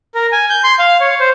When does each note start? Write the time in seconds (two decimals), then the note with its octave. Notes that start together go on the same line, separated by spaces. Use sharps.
0.15 A#4
0.32 G#5
0.50 G6
0.64 C6
0.79 F5
1.00 C#5
1.20 C5